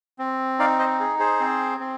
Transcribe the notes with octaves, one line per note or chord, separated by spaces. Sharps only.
C4
D#4 D5 F5
C5 D#5
G#4
G#4 C5
C4
C4